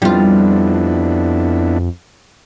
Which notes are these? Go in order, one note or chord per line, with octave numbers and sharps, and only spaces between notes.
F2 G3 B3 D4 E4 F4